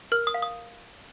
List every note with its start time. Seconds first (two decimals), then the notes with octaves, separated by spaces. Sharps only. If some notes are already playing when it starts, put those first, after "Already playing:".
0.12 A#4 F6
0.27 D#6
0.34 F5
0.42 D#6